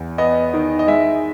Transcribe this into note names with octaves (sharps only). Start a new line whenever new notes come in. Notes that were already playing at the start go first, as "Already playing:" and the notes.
Already playing: E2
B3 D#5
D#3
D#5
G#3 E5